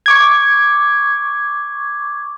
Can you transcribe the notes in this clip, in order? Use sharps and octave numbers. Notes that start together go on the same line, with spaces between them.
C#6 D6 G#6